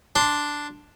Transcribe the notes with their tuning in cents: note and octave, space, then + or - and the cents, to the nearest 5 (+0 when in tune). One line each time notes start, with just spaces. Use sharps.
D4 +0 C6 +0